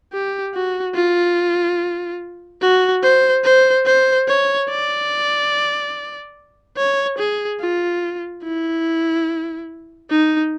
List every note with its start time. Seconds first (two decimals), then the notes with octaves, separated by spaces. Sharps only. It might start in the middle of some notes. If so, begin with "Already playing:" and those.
0.13 G4
0.54 F#4
0.96 F4
2.62 F#4
3.03 C5
3.44 C5
3.86 C5
4.28 C#5
4.70 D5
6.78 C#5
7.18 G#4
7.60 F4
8.44 E4
10.10 D#4